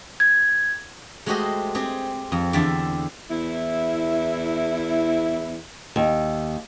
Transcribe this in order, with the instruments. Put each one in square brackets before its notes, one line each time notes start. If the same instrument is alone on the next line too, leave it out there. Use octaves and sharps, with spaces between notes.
[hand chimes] G#6
[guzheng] G#3 A3 F#4 G4 C5 D#5
C4 G4 G#4
F2
E2 D3 G4 E5 A5
[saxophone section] E2 E4
[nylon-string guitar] D#2